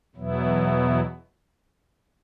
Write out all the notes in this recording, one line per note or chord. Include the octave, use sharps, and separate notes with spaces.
E2 B2 F#3 B3 E4